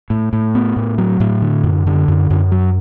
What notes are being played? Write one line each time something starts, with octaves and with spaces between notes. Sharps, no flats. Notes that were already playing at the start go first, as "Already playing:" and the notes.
A2
A2
B3
A2
F#3
A2
D3
F#2
D3
F#2
F#2
F#3